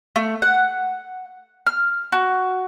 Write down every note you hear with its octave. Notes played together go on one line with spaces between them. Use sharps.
A3
F#5
F6
F#4